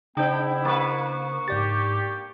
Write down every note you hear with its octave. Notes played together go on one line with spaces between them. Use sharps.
C#3 G#3 B3 D4 E4 C5 G5
A#3 B4 C#6
G#2 G4 D5 A6